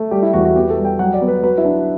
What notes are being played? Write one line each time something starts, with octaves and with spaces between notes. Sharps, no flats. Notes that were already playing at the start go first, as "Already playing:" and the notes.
Already playing: A3
G3 G4
E4
E2 F#4
F#4
B3 G4
A4
G3
G5
F#3 F#5
D5
B3
B4
F#3 B4
E4
D4